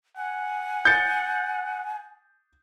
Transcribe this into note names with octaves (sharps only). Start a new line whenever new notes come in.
F#5 G#5
G6 A6 C#7